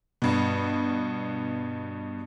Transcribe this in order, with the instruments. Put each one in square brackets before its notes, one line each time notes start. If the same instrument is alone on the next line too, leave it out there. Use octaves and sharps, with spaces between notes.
[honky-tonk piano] G2 B2